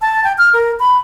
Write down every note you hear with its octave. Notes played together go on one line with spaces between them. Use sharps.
A5
G5
F6
A#4
B5